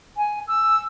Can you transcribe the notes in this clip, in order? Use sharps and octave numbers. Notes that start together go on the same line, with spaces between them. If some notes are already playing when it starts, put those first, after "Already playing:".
G#5
E6